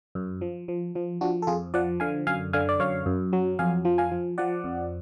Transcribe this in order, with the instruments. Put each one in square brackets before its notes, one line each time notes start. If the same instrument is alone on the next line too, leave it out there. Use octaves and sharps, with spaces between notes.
[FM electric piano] F#2
F3
F3
F3
F3 D4 F#4
A4
F2 F4 G#4
F3 D5 F#5
D3 F5 G#5
F#2 F5 G#5
D3 F5 G#5
D5
F#2 C#5 F5
F#2
F#3
F2 F5 G#5
F3
F5 G#5
F3
F3 D5 F#5
F2